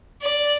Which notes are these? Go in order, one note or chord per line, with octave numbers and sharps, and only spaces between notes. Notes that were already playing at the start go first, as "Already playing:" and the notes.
D5